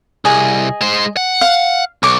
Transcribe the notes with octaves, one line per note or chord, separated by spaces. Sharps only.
C2 G#4 D#5
G#3 C5
F#5
F5
B1 C#6 D6